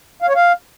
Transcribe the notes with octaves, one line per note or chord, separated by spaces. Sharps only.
F5
C#5
F5